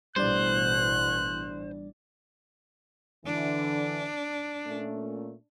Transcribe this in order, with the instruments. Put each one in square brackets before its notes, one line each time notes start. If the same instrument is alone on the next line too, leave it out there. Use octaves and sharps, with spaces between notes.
[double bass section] A1 B2 E3 [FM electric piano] G3 D4 D5 [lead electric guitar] C5 [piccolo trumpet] F#6
[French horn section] D3 E3 [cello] D4
[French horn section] A#2 A3 C#4